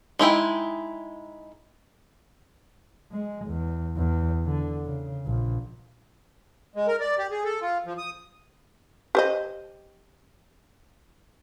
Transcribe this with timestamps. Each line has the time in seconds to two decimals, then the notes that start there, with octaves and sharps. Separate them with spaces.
0.19 G#3 D#4 E4 G5
3.12 G#3
3.46 E2
3.96 E2
4.45 D3
4.85 C#3
5.26 A#1
6.76 G#3
6.87 A#4
7.00 D5
7.18 G4
7.31 G#4
7.45 A4
7.61 F4
7.86 F3
7.98 D#6
9.15 G4 C5 D#5